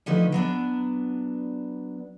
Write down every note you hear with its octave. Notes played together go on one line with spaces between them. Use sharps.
D3 F3 A3 D#4 B4
F#3 B3 D4